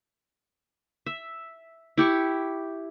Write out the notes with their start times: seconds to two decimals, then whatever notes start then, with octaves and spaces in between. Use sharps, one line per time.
1.06 E5
1.98 E4 G4 C#6